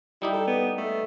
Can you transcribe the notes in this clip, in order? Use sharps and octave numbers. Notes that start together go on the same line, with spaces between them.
G3 D#4 E4 G4
A4
B3
A3